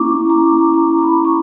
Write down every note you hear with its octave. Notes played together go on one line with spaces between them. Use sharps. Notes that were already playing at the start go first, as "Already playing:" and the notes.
Already playing: A#3 C#4 E4 A#5 C#6 D6
A#5
A#5
A#5
B5
C#6